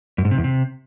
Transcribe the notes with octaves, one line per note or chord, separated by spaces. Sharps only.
F#2
G#2
C3
E2
C3